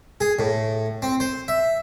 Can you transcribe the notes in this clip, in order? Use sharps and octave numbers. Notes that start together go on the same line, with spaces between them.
G#4
A2
C4
C5
E5